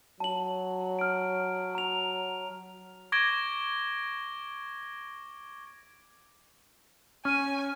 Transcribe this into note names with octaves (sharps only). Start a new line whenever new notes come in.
F#3 A5 F#7
F6 D7
A#5 F7
C#6 D6 G#6 A#6 D7 G7
C#4 G#5 F6 D#7